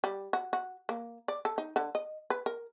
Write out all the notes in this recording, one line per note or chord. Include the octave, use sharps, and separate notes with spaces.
G3
F#4
F#4
A#3
D5
A4
D#4
D3
D#5
B4
A#4